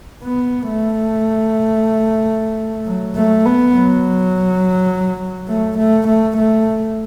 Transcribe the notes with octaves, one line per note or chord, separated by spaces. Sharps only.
B3
A3
F#3
A3
B3
F#3
A3
A3
A3
A3